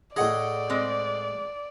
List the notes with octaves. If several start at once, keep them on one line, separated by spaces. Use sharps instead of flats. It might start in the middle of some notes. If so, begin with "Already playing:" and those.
A2 G#4 D5 D#5 F#5
G#3 C4